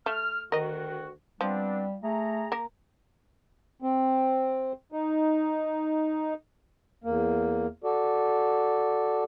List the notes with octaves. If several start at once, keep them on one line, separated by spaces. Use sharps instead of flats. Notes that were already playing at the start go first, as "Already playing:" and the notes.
A3 F6
D2 D#3 F#4 A#4 D#5
F3 G3 B3 C4 D4
A3 G#4 A#5
A#3 A#4
C4
D#4
E2 A#3
F#4 A4 D5